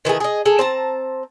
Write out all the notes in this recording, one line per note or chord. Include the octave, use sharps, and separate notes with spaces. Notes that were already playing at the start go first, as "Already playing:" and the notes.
D#3 E3 A3 G#4
G#4 D#5
G#4 A4
C4 A5 A#5